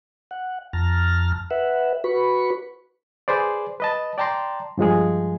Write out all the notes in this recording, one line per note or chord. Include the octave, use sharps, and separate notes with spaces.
F#5
F2 A5 A#5 F6
B4 E5 F#5
F#4 B4 B5 C#6
G#4 B4 C5 D5
B4 D#5 A5
D5 G5 A5 A#5 C6
G2 F3 G#3 G#4